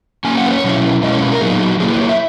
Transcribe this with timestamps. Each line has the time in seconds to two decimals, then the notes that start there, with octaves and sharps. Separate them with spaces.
0.25 F#3 A#3 C#4 G#5
0.38 F#5
0.46 B4
0.51 C#5
0.64 B2 F#3 C#4 E4
1.02 B2 G#3 C#4 E4 D#5
1.12 C#5
1.23 B4
1.32 A#4
1.41 A#2 F#3 B3 D#4 G#4
1.61 F#4
1.80 F#3 A#3 E4 G#4
1.90 B4
2.00 C#5
2.09 E5